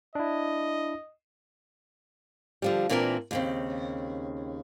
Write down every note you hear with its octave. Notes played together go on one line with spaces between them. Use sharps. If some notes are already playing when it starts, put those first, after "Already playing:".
D4 E4 D#5
D3 F3 G3
A#2 E3 C4 D4 F#4 A#4
D#2 C#3 C4